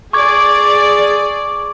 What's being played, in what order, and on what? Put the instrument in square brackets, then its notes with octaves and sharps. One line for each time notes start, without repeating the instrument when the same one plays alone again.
[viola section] G#4 D5 [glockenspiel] C#6 D6 G#6